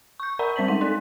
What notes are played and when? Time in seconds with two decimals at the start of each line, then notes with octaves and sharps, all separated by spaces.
0.20 C#6 G6
0.39 A#4 D5 F#5 A#5 B5
0.56 G3 C4 C5 B6 F#7
0.68 G#3 D#4 F#5 B6
0.81 D#4 A4 D5